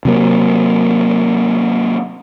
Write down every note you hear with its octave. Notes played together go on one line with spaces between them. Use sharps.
C3 F#3 A#3